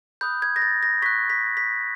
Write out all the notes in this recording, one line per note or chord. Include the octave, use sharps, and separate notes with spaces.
B5 D#6 F#6 G6
G#6
A#6
A6
A#6
C#6 F#6 B6
B6
B6